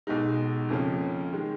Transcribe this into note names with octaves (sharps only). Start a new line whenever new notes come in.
B1 B2 G#3 D#4
F2 C#3 F3 A#3 C#4
D#3 G#3